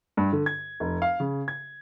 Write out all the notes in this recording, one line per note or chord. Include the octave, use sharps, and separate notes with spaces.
G2
D3
G#6
F1
F5
C#3
G#6